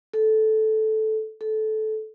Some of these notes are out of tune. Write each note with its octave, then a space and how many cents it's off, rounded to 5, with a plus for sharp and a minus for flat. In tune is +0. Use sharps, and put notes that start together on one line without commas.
A4 -10
A4 -15